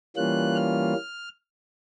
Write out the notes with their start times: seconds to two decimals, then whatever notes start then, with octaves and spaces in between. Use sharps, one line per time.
0.16 E3 G3 A#3 C#4 F4 F#6
0.55 F6